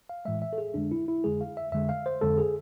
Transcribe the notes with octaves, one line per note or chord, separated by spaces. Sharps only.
F5
A2 E3 G#3 E5
E5
A4
G#4
F2 D3 G#3 D4
E4
E4
F2 D3 G#3 G#4
F5
E5
F2 D3 G#3 E5
F5
C5
F2 D3 G#3 A4
G#4